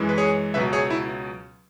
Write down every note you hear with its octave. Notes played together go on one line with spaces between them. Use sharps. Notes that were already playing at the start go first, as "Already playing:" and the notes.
Already playing: F#2 E3 G#3
B4
G#4 C#5
C#2 B2 F#3 B4 E5
G#4 C#5
E4